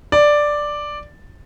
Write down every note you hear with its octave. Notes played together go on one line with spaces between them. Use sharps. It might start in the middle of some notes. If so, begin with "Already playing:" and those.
D5